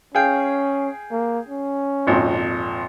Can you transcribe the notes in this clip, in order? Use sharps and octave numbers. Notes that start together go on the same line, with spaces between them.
C#4 G#4 F5 G5
A#3
C#4
G#1 F2 A#2